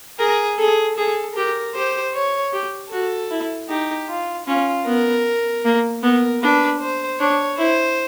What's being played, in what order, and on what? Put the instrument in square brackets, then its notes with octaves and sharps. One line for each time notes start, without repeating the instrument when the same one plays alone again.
[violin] G#4 [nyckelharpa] A#4
[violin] G#4 [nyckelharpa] A4
[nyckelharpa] G#4 [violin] A4
[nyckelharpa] G4 [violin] A#4
[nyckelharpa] G4 [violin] C5
[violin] C#5
[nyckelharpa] G4
[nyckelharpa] F#4 [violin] A4
[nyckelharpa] E4
[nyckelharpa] D#4 [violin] G4
[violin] F4
[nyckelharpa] C#4 [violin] F4
[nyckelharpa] B3 [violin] A#4
[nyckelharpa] A#3
[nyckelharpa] B3 [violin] A#4
[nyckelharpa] D4 [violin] B4
[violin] C5
[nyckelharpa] D4 [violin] C#5
[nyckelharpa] E4 [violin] C5